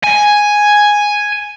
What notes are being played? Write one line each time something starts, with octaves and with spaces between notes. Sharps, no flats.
G#5